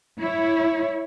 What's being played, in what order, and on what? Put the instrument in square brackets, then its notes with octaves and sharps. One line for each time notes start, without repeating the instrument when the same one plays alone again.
[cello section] E4 C#5